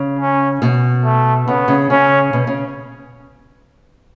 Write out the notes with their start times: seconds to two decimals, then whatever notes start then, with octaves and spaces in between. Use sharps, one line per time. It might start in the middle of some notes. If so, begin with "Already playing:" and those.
Already playing: C#3
0.19 C#4
0.62 B2
1.04 A3
1.47 C#3 B3
1.68 C#3
1.90 C#3 C#4
2.33 B2
2.47 C#3